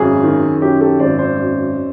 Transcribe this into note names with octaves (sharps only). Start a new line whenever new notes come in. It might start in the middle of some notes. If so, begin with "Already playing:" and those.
Already playing: G#1 F#2 G#4
D#3
F#2 G4
G4 A4
G#1 C5 D5
C5 D5
F#2